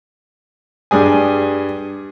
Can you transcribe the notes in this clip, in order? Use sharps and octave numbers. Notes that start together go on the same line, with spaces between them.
G2 G3 G#4 G#5